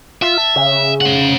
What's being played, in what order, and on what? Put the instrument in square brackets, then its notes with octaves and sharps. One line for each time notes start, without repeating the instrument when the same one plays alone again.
[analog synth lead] F4 [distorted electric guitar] E5
[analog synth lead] A5
C#3
[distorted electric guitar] C5 F#5